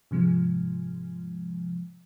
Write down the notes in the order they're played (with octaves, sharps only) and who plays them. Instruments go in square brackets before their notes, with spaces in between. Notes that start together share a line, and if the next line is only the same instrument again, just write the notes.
[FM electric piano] G#2 C3 F3 G#3